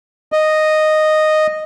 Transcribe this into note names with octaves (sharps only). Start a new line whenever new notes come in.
D#5